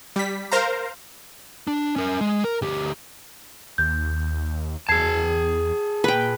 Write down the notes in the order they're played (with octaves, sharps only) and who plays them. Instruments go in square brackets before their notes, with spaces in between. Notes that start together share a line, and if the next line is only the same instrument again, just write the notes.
[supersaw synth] G3 B6
A#4 C5 F5 A#5
[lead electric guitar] D4
C#4 A#4
G#3
A#4
D2 G4
[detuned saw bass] D#2 [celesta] G6
[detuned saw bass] E2 [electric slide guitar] G#4 A5 [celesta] G#6 C7
[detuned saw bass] A#2 [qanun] B4 G5